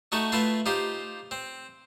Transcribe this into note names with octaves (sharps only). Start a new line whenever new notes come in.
A3 D#4 F#4 A4
A3 E4 F4 B4 B5 C6
D#4 F4 G4 C5
C4